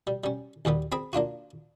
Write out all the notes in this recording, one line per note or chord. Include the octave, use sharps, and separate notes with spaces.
G3
G3 C#4
D#2 A#2 G3 B3
C4 G#4 B5
A#3 D4 F4 F#4